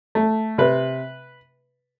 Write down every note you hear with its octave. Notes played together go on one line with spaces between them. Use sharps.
A3
C3 B4